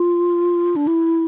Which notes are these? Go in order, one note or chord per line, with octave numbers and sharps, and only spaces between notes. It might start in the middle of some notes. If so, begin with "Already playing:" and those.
Already playing: F4
D4
E4